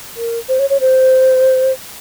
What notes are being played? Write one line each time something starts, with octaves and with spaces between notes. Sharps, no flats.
A#4
C5
C#5
C#5
C5